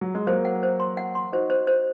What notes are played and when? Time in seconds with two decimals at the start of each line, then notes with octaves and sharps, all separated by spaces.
0.01 F#3
0.15 G#3
0.27 F#3 A#3 C5
0.45 F#5
0.63 C5
0.80 C6
0.97 F#5
1.15 C6
1.32 D#4 F#4 C5
1.50 C5
1.67 C5